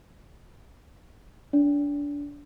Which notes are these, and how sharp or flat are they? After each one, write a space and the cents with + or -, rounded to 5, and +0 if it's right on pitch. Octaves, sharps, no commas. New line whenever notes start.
D4 -25 D5 -40